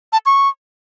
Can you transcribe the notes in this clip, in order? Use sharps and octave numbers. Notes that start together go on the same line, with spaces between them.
A5
C#6